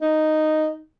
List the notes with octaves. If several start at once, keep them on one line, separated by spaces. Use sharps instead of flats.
D#4